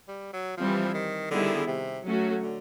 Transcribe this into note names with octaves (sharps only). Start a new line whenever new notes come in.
G3
F#3
E3 F3 G3 C4
D#3
D3 D#3 G3 B3 E4 G#4
C3
F#3 A3 C#4 F#4
D3